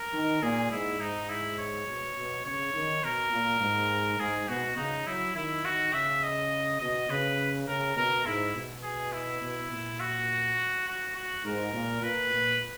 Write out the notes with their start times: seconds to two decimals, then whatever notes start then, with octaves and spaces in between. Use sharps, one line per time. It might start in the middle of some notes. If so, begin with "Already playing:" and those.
Already playing: A#4
0.13 D#3
0.42 A#2 G#4
0.71 G#2 E4
1.00 G#2 D#4
1.29 E4
1.59 C#5
1.87 B2
2.16 B2
2.45 C#3 C#5
2.74 D#3
3.04 B2 A#4
3.32 A#2
3.61 G#2
4.19 G#2 G#4
4.48 B2 F#4
4.77 C#3 D#4
5.06 F#3 E4
5.35 D#3 E4
5.65 D#3 F#4
5.93 C#3 E5
6.23 D#5
6.81 B2 D#5
7.09 C#3 B4
7.68 C#3 A#4
7.96 B2 A#4
8.26 G#2 E4
8.55 B2
8.83 G#4
9.13 E4
9.42 B2
9.71 A#2
10.00 F#4
10.87 F#4
11.15 F#4
11.44 G#2 A#4
11.74 A#2
12.03 A#2 B4
12.32 A#2